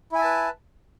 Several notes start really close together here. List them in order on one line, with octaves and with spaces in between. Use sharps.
E4 G#5 E5 A5 B4